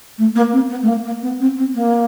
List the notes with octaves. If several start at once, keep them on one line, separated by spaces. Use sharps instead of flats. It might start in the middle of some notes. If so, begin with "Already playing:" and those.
A3
A#3
C4
B3
A3
A#3
A#3
B3
C4
C4
A#3